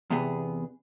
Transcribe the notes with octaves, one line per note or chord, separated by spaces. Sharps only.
E2 C3 B3 G#4